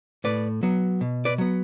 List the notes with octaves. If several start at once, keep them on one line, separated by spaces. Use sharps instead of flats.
A2 B4 D5
F#3 B3
B2
B4 D5
F#3 B3